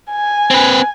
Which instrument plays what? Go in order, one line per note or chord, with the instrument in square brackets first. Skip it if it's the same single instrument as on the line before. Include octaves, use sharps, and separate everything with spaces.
[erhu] G#5
[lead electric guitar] C4 B4